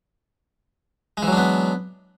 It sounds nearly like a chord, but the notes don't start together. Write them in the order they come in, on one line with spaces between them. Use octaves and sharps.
G#3 E3 F#3 D4 B3